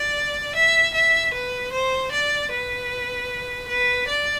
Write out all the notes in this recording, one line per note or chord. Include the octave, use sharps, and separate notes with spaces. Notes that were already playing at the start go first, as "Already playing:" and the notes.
Already playing: D5
E5
E5
B4
C5
D5
B4
B4
D5